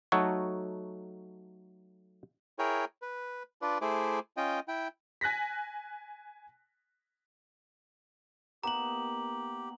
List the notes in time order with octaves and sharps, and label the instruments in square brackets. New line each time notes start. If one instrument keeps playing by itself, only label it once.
[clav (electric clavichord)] F#3 A3 D#4 F#4 A4 C#5
[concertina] E4 G#4 A#4 C#5 G5
B4
D4 F4 B4 D5
A3 E4 G#4 C5 D6
C#4 F4 D#5 G5
E4 G5
[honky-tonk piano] G#5 F#6 A#6 B6
[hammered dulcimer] A#3 B3 D#4 [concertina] G4 [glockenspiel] A#5 F#7